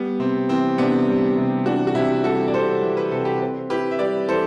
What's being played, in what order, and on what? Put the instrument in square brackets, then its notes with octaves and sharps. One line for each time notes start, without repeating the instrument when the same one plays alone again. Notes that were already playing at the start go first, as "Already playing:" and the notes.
Already playing: [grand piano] G3 [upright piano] B3
[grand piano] C3 [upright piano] C4
[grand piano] E3 [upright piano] C4
[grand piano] C3 [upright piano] B3 D4
[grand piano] G3
C3
[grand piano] E3 [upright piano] D4 F#4
[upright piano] F#4
[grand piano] C3 [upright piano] E4 G4
[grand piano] G3 [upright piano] F#4 A4
[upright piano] D5
[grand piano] C3 [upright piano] A4 C5
[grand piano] E3
[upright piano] B4
[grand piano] C3 [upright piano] A4
[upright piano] G4 B4
[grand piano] C4
[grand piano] E4 [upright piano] G4 B4
[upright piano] E5
[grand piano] G3 [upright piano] B4 D5
[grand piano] E3 [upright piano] A4 C5